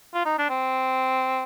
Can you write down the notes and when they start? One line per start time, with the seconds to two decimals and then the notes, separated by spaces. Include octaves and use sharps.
0.14 F4
0.26 D#4
0.38 D4
0.49 C4